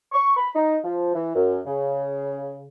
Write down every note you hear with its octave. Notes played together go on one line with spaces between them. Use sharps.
C#6
B5
D#4
F3
E3
F#2
C#3